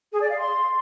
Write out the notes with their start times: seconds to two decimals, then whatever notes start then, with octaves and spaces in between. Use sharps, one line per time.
0.12 G#4
0.21 D5
0.29 F5
0.38 C6